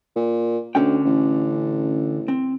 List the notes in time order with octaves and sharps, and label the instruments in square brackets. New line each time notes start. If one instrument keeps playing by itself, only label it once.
[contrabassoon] A#2
[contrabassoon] D2 [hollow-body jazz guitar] D3 C#4 G5
[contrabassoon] A1
[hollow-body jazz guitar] C4